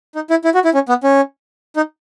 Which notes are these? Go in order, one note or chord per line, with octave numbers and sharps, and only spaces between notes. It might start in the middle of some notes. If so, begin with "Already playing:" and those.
D#4
E4
E4
F#4
E4
C#4
B3
C#4
D#4